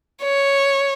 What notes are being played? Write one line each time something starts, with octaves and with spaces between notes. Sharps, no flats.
C#5